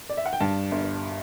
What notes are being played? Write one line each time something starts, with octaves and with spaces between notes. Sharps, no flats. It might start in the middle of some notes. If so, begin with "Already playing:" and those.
D5
E5
F#5
G5
G2 A5
G1